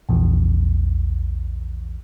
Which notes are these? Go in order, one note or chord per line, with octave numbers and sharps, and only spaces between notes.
A#1 E2